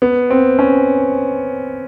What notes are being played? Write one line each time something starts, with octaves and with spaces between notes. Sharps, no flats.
B3
C4
C#4